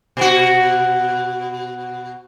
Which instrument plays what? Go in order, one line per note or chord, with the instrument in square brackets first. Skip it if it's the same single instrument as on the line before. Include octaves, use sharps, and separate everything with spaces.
[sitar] B2 F#4